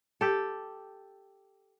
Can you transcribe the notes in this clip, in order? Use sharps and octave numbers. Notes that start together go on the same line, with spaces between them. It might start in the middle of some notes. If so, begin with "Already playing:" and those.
G4 A4